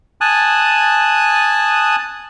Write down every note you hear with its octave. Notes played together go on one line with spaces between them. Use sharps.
G#5 A5 D#6 F#6